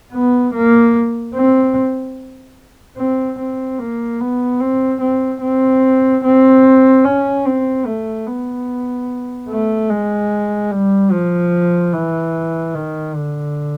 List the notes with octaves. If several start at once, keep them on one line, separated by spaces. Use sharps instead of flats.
B3
A#3
C4
C4
C4
A#3
B3
C4
C4
C4
C4
C#4
C4
A3
B3
A3
G#3
G3
F3
E3
D#3
D3